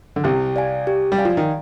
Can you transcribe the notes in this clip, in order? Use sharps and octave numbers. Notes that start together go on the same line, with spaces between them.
D3
C2 C3 G4
D5 F5 G#5
G4
G3
D5 F5 G#5
F3
D#3